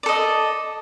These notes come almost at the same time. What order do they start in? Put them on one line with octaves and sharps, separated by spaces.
D5 A4 D#5